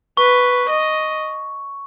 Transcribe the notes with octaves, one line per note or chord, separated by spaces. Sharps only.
B4 C#6
D#5